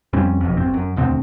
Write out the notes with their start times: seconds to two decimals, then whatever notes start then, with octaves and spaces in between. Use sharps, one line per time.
0.13 F2 G3 C4 C#4
0.41 F#1 B1 F2
0.57 G1 C4
0.74 F#2
0.96 E1 D2 D3 C4